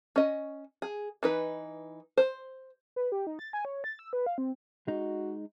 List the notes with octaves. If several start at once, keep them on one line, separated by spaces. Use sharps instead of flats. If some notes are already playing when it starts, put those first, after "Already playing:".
C#4 D#5
G#4
E3 D#4 B4
C5
B4
G4
D#4
A6
G#5
C#5
A6
E6
B4
F5
C4
G#3 D#4 F#4